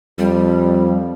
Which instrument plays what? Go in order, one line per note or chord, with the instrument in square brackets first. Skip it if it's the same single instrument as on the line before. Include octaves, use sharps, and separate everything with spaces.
[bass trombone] F2 [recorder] G3